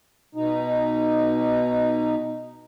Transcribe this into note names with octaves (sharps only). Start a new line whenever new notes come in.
B2 D#4